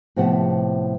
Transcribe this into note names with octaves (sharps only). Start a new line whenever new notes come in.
A2 C3 F3 B3 F#5 A5